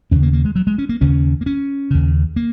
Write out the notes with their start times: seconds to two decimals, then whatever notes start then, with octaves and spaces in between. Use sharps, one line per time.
0.11 D#2 C#3 C#4
0.23 A#3
0.33 A#3
0.45 G#3
0.56 F#3
0.67 G#3
0.78 C#4
0.89 A#3
1.01 D#2 C#3 C#4
1.41 A#3
1.46 C#4
1.91 D#2 C#3
2.36 A#3